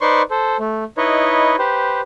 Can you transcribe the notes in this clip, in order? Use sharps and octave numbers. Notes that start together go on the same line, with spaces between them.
D#4 B4 C5 D5 C6 C#6
A4 C5
A3
D#4 E4 B4 C#5 D#5
G4 B4 C5